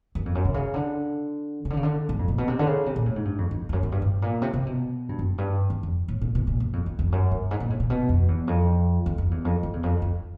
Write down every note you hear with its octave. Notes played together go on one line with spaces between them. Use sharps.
F#2
F2
F#2
C3
C#3
D3
C#3
D3
C#3
D3
G#2
F2
A#2
B2
C3
D3
C#3
C3
A#2
A2
G#2
G2
F2
F2
F2
F#2
F#2
G2
A2
A#2
C3
C3
B2
G2
F#2
G2
E2
F2
A2
A#2
B2
A#2
F#2
F2
F2
F2
F#2
G2
G#2
A#2
A2
A#2
B2
F2
E2
F2
E2
F2
E2
F2
F2
E2
F2
F2